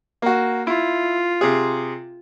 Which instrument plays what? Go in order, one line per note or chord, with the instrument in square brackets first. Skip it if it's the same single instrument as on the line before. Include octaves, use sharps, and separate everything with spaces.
[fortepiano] A#3 F#4
[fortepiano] E4 [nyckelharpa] F4
[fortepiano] C3 G#4